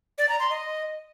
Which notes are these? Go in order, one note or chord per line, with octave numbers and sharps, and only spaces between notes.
D5
A#5
C6
D#5